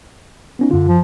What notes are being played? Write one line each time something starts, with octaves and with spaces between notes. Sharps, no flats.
B3 C#4 D#4
F#2 D3 F4
F3